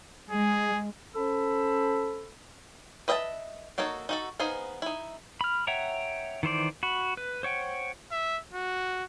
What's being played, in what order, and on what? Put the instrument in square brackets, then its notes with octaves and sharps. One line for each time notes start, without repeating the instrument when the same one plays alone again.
[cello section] G#3 [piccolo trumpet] G#4
[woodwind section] C#4 A4 C5 B5 E6
[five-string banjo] B4 D#5 E5 G5 A5
A#3 D#4 F#4 A4 C#5
D#4 F#4 A4
B3 D#4 G#4 C5 F5
D#4 E4
[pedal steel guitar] B5 F6
C#5 E5 F#5 G5 A#5
D#3 E3 C5 D5
F#4 B5
B4
C5 C#5 F#5 G5
[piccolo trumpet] E5
F#4